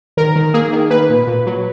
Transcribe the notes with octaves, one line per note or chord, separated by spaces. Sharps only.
D#3 A#4
D#3
A#3 G#4
D#3
A#3 B4
A#2
A#2
F#3